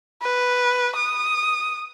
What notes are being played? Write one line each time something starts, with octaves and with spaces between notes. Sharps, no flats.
B4
D#6